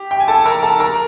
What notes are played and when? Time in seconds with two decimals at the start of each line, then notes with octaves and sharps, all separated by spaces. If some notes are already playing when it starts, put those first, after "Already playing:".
Already playing: G4
0.11 G5
0.20 G#5
0.28 A4 A5
0.46 A#4 A#5
0.63 A4 A5
0.80 A#4 A#5